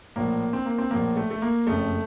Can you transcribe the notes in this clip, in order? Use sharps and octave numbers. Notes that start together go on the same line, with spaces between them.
A#1 A2 F3 A#3
C4
A#3
C4
A#1 A2 F3 A#3
A3
A3
A#3
F#1 F2 C#3 A3